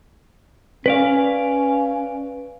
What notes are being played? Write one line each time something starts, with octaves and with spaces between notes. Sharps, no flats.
C#4 B4 D5 F5